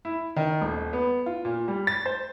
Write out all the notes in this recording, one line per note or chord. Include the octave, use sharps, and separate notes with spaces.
E4
D#3
D#1
B3
F4
A#2
G3
A6
C5